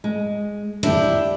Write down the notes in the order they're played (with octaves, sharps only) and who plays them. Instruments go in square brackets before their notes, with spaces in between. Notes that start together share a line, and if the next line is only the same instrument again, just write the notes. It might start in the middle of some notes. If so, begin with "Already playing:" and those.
[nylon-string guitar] G#3
[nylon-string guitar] D4 G4 [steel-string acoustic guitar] E4